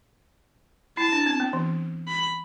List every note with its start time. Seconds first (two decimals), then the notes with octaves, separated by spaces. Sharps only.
0.97 E4 A5
1.12 D4
1.26 C4
1.40 B3
1.53 E3
2.08 B5